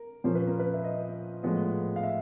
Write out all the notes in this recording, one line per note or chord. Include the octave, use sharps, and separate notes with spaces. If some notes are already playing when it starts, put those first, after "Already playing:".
Already playing: A#4
A#2 F3 A#3 C#4 C5
B4
A#4
B4
E5
D#5
A2 F3 G#3 B3
F5
E5